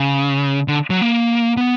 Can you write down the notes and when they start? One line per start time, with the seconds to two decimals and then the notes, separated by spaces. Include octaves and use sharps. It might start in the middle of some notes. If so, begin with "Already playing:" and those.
Already playing: C#3
0.68 D3
0.90 F#3
1.02 A#3
1.57 B3